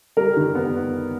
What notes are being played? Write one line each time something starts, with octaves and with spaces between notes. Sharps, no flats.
G3 A#4
D#3
B3